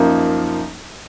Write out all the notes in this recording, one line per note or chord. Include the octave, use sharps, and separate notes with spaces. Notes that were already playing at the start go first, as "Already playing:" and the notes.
Already playing: F#2 F3 A#3 D#4